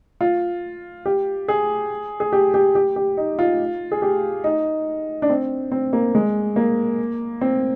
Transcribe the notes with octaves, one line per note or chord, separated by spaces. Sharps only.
F4
G4
G#4
G#4
G4
G4
G4
G4
D#4
F4
G#4
G4
D#4
D4
C4
C4
A#3
G#3
A#3
C4